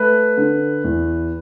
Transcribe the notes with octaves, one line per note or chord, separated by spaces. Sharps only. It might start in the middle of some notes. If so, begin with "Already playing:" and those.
Already playing: A3 B4
D3
E2